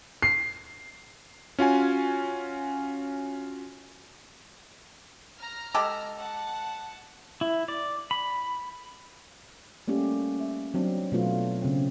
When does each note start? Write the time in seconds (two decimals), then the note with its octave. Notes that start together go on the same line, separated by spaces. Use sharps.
0.22 C7
1.59 C#4 F4 F#4 G#5
5.39 A#5 F6
5.74 G#3 G4 A4
6.17 F#5 A5
7.41 E4
7.68 D5
8.11 B5
9.88 G3 A3 A#3 C#4 G4
10.40 E5
10.74 F#3 C4 D4
11.12 B2 F#3 A3 F4 B4
11.62 C#3 C4